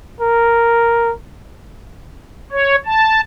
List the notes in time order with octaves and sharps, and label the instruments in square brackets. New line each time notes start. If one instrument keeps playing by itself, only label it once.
[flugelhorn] A#4
[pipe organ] C#5
A5